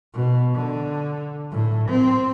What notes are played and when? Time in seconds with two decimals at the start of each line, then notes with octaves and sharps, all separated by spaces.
0.14 B2
0.54 D3
1.51 A2
1.89 C4